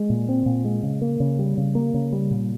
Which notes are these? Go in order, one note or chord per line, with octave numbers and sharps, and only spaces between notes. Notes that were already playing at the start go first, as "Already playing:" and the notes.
Already playing: G#3
A#2
C4
A#2
G#3
C#3
A#3
C#3
G3
C#3
A#3
C#3
G3
A#2